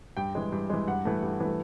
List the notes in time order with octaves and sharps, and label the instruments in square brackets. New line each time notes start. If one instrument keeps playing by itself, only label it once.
[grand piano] G2 G5
E3 G#3
G2
E3 G#3
G2 F#5
E3 A3
G2
E3 A3